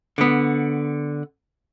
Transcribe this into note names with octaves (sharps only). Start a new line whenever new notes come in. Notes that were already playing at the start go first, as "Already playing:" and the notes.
D3 B3